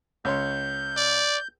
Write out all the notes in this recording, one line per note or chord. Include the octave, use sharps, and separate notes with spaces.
C#2 C#5 C6 G6
D5